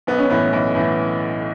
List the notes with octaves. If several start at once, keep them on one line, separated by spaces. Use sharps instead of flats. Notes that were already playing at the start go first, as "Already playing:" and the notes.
B1 B3
C#4
A2 E3 B3
B1
A2 E3